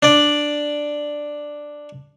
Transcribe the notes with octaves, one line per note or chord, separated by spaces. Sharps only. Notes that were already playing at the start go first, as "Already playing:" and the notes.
D4 D5